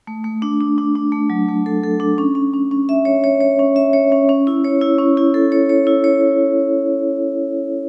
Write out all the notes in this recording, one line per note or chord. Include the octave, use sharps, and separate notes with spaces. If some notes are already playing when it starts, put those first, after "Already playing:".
A3
A3
D4
D4
D4
D4
A3
F#3
A3
A4
A4
D4
C#4
C#4
C#4
C#4
E5
C#5
C#5
C#5
C#4
E5
C#5
C#4
C#4
E4
C#5
E4
C#4
E4
A4
C#5
C#5
E4
C#5